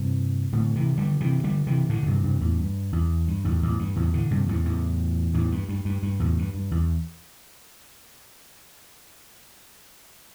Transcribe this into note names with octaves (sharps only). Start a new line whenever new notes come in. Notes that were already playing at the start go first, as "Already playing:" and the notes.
Already playing: G2 C3
A2 D3
C3 E3
D3 G3
C3 E3
D3 G3
C3 E3
A2 D3
A2
G2 C3
G2 C3
E2 A2
G2
E2
G2
E2 A2
E2 A2
G2
E2 A2
A2 D3
G2 C3
E2 A2
E2 A2
E2 A2
G2
G2
G2
G2
E2 A2
G2
G2
E2